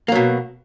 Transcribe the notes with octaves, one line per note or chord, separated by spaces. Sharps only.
B2 F#3 A#3